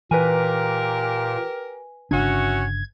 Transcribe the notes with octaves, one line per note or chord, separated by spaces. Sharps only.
A#2 E3 G4 A#4 B4 G#5
G1 C#3 C#4 D4 E4 F#4 G#6